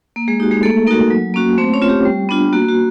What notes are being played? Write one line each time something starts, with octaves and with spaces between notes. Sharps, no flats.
A#3
G#3 G#4
D#4 F#4 G4
G#3 G#4
A3 A#3 A4
A#3 D#4 F#4 A#4
F#3
A#3 C#4 F#4
A3 C4 C5
C#4 C#5
C4 F4
G4
G3
B3 D4 F4
A#3 F#4
F#4